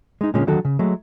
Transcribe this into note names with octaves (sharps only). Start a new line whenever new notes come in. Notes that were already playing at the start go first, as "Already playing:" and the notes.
G#3 D#4
A#2 D3 G#3 C#4
D3 D#3 F#3 F#4 A4
C#3
F#3 G#3 A3